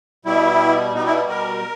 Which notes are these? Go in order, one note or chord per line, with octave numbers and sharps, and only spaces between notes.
B2 G3 E4
B2 G3 D#4
E4
A#4